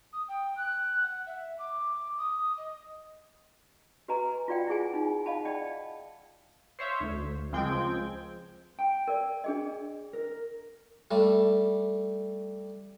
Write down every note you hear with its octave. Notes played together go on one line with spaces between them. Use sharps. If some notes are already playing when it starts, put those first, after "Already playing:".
D#6
G5
F#6
F#5
E5
D6
D#6
D#5
F#4 B4 D#5 G#5 A#5
F4 F#4 D5 F#5 G5
E4 F4 G#4 G#5
D#4 F4
D#5 F5 F#5 A5 B5
D5 D#5 G5 A5
C5 C#5 E5 F5
D2
C#2 F3 G#3 C4 G5 G#6
G5
A#4 D5
D4 G#4 D#5
A#4
G3 A3